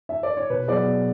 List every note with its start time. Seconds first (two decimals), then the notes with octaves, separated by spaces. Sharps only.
0.09 E5
0.23 D5
0.37 C#5
0.50 B2 B4
0.68 F#3 B3 E4 G#4 D5
0.86 B2